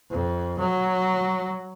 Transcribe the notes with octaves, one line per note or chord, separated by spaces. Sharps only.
F2
F#3